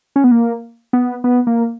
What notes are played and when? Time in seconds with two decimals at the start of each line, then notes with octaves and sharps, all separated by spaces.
0.16 C#4
0.24 B3
0.31 A#3
0.93 B3
1.24 B3
1.47 A#3